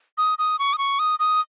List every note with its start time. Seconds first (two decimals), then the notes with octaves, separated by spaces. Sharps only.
0.18 D#6
0.38 D#6
0.59 C#6
0.73 D#6
0.78 C#6
0.99 D#6
1.19 D#6